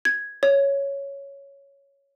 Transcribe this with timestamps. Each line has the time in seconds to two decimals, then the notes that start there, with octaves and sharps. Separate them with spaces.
0.05 G#6
0.43 C#5